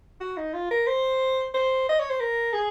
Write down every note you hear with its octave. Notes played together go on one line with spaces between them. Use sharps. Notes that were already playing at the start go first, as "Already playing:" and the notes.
F#4
D#4
F4
A#4
C5
C5
D#5
C#5
C5
A#4
G#4